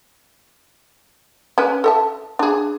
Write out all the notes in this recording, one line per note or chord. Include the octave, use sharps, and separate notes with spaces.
C#4 B4
A4 E5 A5
D4 G#4